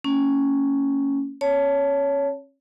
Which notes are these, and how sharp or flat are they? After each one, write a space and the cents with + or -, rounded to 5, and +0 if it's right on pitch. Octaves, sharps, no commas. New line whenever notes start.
A#3 -35 C#4 +0
C#4 -35 C#5 +15 A5 +0